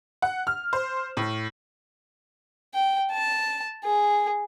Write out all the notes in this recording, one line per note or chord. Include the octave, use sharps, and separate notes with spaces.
F#5
F6
C5
A2
G5
A5
G#4